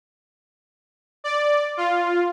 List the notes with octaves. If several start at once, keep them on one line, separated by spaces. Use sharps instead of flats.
D5
F4